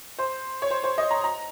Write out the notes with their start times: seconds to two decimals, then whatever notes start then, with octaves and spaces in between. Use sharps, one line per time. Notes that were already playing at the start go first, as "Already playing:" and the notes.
0.19 C5
0.62 C#5
0.71 C5
0.84 C5
0.98 D#5
1.11 A#5
1.24 A#5